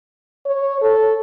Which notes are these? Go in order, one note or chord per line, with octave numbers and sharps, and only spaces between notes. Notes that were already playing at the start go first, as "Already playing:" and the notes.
C#5
A4